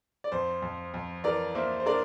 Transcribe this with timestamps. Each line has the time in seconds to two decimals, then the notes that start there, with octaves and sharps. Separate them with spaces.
0.24 D5
0.32 F2 C5
0.62 F2
0.94 F2
1.24 E3 A#4 D5
1.55 A#3 C5 E5
1.80 C5
1.86 D4 A#4 D5